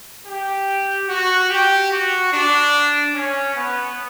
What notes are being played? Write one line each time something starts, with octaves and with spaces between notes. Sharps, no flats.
G4
F#4
G4
F#4
D4
C#4
B3